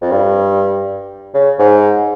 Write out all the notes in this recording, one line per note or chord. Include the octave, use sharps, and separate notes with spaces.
F2
G2
C#3
G#2